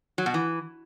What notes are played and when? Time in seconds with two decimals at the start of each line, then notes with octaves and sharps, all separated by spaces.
0.18 F#3
0.26 B2
0.34 E3